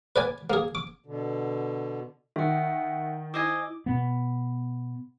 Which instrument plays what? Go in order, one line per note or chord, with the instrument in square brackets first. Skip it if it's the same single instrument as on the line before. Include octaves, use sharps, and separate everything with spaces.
[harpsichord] B4 D5 G#5
A#3 G#4
D6
[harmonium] B2 D3
[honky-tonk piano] D#3 [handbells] E5 F#5
[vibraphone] E4 [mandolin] C5 D#5 G#5 [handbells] D6
[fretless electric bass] B2 B3